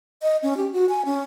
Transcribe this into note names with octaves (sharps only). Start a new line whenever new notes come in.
D#5
C#4
G4
F#4
G#5
C#4